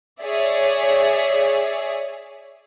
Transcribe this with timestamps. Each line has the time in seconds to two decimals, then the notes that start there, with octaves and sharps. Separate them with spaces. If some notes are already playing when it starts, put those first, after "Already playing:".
0.22 G#4 C#5 D5 E5